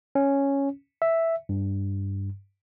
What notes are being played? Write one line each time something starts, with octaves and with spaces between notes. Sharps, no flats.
C#4
E5
G2